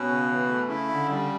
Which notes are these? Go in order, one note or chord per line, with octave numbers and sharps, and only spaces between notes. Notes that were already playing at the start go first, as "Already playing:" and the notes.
Already playing: B2 C#4
C#3
E3
A3
C#3 E4
D3
G3